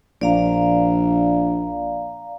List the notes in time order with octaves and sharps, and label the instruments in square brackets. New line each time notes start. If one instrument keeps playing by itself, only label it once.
[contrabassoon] A#1 [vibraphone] D5 F5 A#5